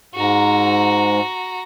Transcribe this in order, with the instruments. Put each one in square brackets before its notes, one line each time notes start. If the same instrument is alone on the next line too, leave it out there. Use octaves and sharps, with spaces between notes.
[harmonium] G#2 [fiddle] F#4 A#5